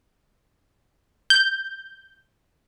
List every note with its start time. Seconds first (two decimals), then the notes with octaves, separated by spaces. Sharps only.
1.30 G6